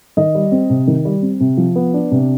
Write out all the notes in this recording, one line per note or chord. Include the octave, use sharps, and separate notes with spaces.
D#3 D#5
G3
C4
C3
D#3
G3
C4
C3
F3
B3
D4
C3